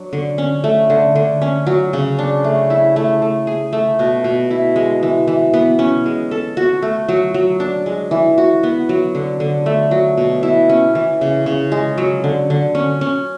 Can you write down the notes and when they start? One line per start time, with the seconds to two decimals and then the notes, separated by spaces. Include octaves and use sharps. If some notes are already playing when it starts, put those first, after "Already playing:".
Already playing: F#3 D4
0.13 D3
0.38 C#4
0.64 A3
0.90 D3
1.15 D3
1.42 C#4
1.66 F#3
1.93 C#3
2.19 D4
2.44 A3
2.70 E4
2.96 A3
3.22 A3
3.47 G#4
3.73 A3
3.99 B2
4.24 B2
4.51 E4
4.76 G#3
5.03 E3
5.28 E3
5.54 B3
5.79 C#4
6.06 G#3
6.31 A4
6.57 F#4
6.82 A3
7.08 F#3
7.34 F#3
7.60 D4
7.86 G#3
8.11 E3
8.38 F#4
8.63 B3
8.89 F#3
9.15 D3
9.40 D3
9.66 A3
9.91 F#3
10.17 B2
10.43 E4
10.69 C#4
10.95 E3
11.21 C#3
11.46 C#3
11.72 G#3
11.98 F#3
12.24 D3
12.50 D3
12.75 C#4
13.01 C#4